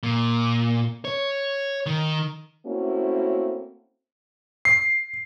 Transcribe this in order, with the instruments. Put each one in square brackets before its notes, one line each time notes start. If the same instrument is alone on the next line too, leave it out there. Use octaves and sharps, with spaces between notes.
[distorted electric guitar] A#2
C#5
D#3
[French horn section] A3 A#3 C4 C#4 E4 F#4
[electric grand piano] C7